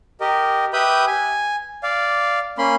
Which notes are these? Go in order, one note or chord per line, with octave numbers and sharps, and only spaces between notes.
G4 A#4 D#5
G4 B4 E5 B5 D#6 G6
G#5
D5 F5
A#3 C#4 B5 C6